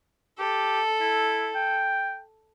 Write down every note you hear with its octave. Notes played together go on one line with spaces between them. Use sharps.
G4 A4
E4
G5